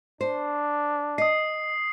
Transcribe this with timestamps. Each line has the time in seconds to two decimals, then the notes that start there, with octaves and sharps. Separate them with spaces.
0.21 D4 C5
1.18 D#5 D#6 C7